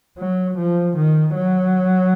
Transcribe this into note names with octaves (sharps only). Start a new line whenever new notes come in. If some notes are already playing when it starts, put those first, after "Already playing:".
F#3
F3
D#3
F#3